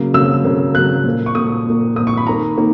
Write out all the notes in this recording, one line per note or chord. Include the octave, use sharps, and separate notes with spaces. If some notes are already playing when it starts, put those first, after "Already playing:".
Already playing: C#3 F#3 A#3
C#3 F#3 A#3 E6
C#3 F#3 A#3
C#3 F#3 A#3 F#6
A#2 A#3
C#6
A#2 A#3 D#6
A#2 A#3
A#2 A#3 D#6
C#6
B5
D#3 A#3 A#5
D#3 A#3